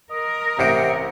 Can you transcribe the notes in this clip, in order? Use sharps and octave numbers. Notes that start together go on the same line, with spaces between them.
A#4 D#5
A1 C3 C#7 D7